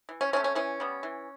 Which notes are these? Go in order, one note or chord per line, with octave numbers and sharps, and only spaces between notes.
E3
C#4
A3 C4 C#4
C#4
E3 C#4
G3 B3
E3